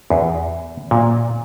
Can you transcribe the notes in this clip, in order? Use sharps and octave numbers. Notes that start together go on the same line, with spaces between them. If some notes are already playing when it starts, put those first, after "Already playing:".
E2
A#2